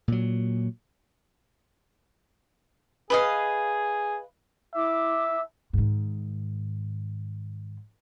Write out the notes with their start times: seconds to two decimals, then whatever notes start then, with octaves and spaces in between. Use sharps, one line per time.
0.08 A#2 F#3
3.10 G#4 B4 D#5 F5
4.74 E4 E5 D6
5.73 G#2 D#3